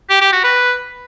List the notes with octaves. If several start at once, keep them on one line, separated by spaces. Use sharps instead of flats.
G4
G4
F#4
B4